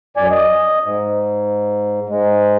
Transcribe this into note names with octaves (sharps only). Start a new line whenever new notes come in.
F#2 D5 G#5
D#5
G#2
G#2 G#3